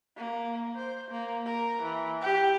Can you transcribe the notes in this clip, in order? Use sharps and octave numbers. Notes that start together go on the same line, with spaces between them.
A#3
C5
A#3
A#4
E3
G4